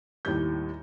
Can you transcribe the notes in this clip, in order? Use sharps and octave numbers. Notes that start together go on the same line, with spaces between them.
D#2 A2 G3 G6